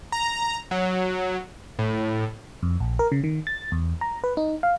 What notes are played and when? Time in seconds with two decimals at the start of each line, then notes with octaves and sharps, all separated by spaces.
0.12 A#5
0.71 F#3
1.79 A2
2.63 F2
2.80 A#1
2.99 A#4
3.12 C#3
3.24 D#3
3.47 A6
3.72 E2
4.01 A#5
4.24 B4
4.37 D#4
4.63 F5